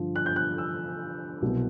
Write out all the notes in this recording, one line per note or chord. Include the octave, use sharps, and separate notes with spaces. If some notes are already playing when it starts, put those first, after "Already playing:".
Already playing: G2 D3 F3
F#6
G6
F#6
E6
C2 B2 F#3 B3